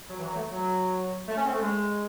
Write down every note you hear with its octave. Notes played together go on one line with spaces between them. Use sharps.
F#3
E3
F#3
A3
F#3
A3
C#4
C4
A3
G#3